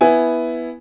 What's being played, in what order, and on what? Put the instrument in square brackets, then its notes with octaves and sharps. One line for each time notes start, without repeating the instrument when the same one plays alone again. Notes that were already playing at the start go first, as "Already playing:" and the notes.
[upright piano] B3 E4 G#5